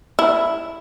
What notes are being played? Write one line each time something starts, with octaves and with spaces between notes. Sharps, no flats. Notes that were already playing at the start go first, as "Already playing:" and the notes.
E4